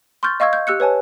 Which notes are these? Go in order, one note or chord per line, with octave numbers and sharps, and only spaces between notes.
C6 C#6 F6 G6 A6
D#5 F5 C#6 E6 G#6
G6
G4 E6 F#6 C#7
B4 C#5 G#5 A5